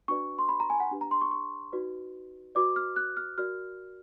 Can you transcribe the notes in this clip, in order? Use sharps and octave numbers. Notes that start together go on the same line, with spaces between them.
D4 F#4 B4 D5 C#6
C6
B5
A#5
G#5
F#5
D4 G4 B4
A#5
C6
C#6
C#6
D#4 F#4 B4 D5
F#4 B4 D5 D6
F6
F#6
F6
F#4 A#4 D5 F6